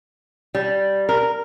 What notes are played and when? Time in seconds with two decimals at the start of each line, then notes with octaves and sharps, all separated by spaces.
0.55 G3
1.09 A#4